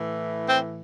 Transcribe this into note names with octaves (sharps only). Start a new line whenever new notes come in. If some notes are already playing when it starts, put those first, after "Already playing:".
Already playing: A2 E3
C4